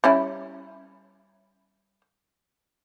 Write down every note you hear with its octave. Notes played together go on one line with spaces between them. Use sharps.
G3 C#4 E4